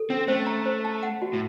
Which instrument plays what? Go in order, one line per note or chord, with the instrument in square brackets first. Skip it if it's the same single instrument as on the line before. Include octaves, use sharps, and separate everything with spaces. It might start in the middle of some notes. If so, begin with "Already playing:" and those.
Already playing: [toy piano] A4
[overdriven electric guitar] C4 [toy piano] C#4
[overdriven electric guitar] A3 [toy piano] C5
[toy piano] A#5
C5
A5
F#5
F#4
[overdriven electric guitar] A2